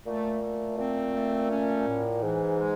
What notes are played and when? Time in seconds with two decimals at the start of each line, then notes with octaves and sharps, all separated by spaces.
0.06 A#2 A3
0.42 A3
0.78 A#2 C4
1.14 A3
1.51 C#4
1.87 A2
2.22 G#2 E3
2.58 G#3